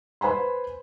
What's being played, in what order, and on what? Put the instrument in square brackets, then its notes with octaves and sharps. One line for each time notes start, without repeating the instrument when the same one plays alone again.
[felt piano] B4 C5 G#5 B5 C6